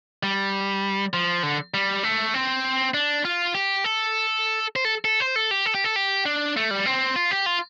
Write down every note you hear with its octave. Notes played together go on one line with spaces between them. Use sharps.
G3
F3
D3
G3
A3
C4
D4
F4
G4
A4
C5
A4
A4
C5
A4
G4
A4
G4
A4
G4
D4
A3
G3
C4
F4
G4
F4